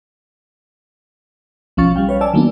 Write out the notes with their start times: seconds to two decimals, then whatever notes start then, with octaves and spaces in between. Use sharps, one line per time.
1.77 B1 F3 C#4 F5 C#6 A6
1.96 G3 F5 G5
2.09 B4 C#5 F5
2.21 C#5 D5 G#5 A5 E6
2.33 D#3 F#3 A#3 B3 D4